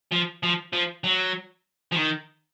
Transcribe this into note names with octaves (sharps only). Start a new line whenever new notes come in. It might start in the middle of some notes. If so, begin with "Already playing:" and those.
F3
F3
F3
F#3
F3
D#3